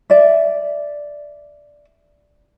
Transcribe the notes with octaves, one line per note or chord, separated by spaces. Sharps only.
D5 E5